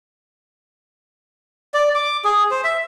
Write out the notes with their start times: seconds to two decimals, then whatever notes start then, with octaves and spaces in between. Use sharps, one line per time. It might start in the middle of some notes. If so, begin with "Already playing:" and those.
1.74 D5
1.95 D6
2.24 G#4
2.51 C5
2.64 E5